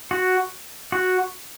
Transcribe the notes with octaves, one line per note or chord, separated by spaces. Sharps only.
F#4
F#4